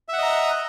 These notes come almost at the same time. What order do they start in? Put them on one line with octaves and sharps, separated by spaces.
E5 F#5 D#5 A#5